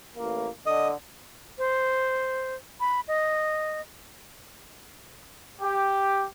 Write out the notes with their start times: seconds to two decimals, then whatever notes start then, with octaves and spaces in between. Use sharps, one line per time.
0.16 A1 A#3
0.66 D3 D#5
1.58 C5
2.80 B5
3.08 D#5
5.62 G4